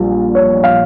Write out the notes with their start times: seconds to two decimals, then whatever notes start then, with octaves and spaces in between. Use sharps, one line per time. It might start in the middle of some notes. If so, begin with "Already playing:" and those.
Already playing: A#1 A#2 G3
0.35 C#5
0.64 F5